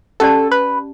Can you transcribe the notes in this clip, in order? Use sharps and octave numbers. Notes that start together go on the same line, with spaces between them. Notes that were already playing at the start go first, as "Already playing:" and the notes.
C#4 G4 A4 D5 A5
B4